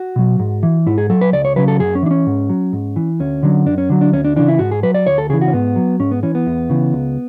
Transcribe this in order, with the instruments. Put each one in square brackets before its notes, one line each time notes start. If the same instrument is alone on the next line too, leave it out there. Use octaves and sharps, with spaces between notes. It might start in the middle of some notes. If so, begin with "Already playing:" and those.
Already playing: [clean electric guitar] F#4
B2 F#3
G#2
E3
G#2 E4
G#4
F#3 A4
B4
C#2 D5
C#5
C#3 F#3 B4
A4
F#2 G#4
C#4
E3 D4
C#4
G#2
F#3
G#2
E3
D2 C#4
D3 F#3
F#2 D4
C#4
D3 F#3
D4
D2 C#4
D4
C#3 E3 D4
E4
G#2 F#4
G#4
F#3 B4
D5
D2 C#5
A4
C#3 E3 G#4
F#4
C#4
G#2 B3
F#3
G#2 C#4
B3
E3 C#4
B3
E2
C#3 E3
C#2